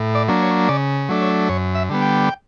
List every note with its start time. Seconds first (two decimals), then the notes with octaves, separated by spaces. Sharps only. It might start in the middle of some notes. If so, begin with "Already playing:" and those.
Already playing: A2
0.15 D5
0.28 F#3 A#3 D4
0.42 C#5
0.69 C#3 D5
1.09 F#3 A3 D4
1.22 C#5
1.49 F#2 C#5
1.75 E5
1.89 D3 G3 B3
2.02 G5